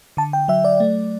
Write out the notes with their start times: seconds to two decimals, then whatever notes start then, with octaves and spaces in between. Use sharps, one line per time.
0.17 D3 A5
0.33 G5
0.48 F#3 E5
0.64 D5
0.80 A3